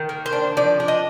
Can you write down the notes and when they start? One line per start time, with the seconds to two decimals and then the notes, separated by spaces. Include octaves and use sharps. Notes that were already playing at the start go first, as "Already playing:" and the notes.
Already playing: D#3
0.09 A#3
0.26 C5
0.33 D4
0.57 F3 D5
0.80 D4
0.88 D#5